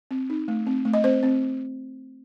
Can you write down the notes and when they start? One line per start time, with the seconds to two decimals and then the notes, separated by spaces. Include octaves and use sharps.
0.11 C4
0.30 D#4
0.48 A3
0.67 C4
0.85 A3
0.94 D#5
1.04 C4 C5
1.23 C4